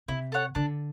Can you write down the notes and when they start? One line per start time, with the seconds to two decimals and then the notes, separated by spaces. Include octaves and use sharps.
0.08 C3 E4
0.32 A4 C#5 F#5
0.55 D3 D4